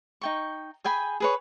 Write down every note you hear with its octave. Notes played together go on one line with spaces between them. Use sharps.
D#4 G5 C#6
G#4 G5 G#5 B5
G#4 B4 C#5